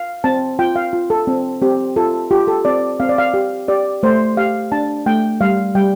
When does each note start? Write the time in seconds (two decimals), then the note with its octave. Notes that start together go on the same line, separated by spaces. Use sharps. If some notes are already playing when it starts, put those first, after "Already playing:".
Already playing: F5
0.24 C4 A5
0.59 F4 G5
0.76 F5
0.93 F4
1.10 A4
1.27 C4
1.62 C4 G4
1.96 F4 A4
2.31 F4 G4
2.48 A4
2.65 C4 D5
3.00 C4 F5
3.09 D5
3.18 F5
3.34 G4
3.68 G4 D5
4.03 A3 C5
4.37 G4 F5
4.72 D4 A5
5.06 A3 G5
5.41 G3 F5
5.75 G3 G5